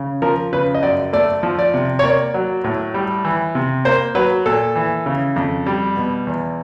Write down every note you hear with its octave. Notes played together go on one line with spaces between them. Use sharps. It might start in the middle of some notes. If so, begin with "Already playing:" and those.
Already playing: C#3
F3 A#4
C#3 B4
D#5
F#2 D5
A3 D5
F3
D5
C3
C#5
A#3 D5
F#3
A2
G3
E3
C3
A#3 C5
F#3 B4
A#2 A4
E3
C#3
F2
G3
B2
E2